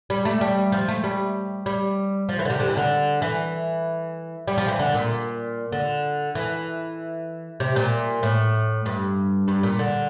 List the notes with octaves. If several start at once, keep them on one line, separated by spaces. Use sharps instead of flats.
G3
A3
G3
F3
A3
G3
G3
F3
E3
D3
C3
D3
E3
D3
E3
G3
F3
E3
D3
A#2
D3
E3
C3
A#2
A2
G2
G2
A#2
D3